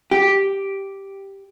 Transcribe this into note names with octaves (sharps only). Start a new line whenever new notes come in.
G4